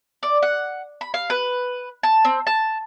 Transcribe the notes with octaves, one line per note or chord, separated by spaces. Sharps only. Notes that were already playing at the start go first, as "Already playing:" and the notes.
D5
F#5
B5
F5
B4
A5
C4
A5